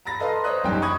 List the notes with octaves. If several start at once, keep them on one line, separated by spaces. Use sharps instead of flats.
A#5 B5 A6 A#6
A4 B4 D#5 F5 A#5 C6
C5 C#5 D#5 D#6 F#6
F#1 G#2 G3 G5
B5 C#6 D#6 F#6 G#6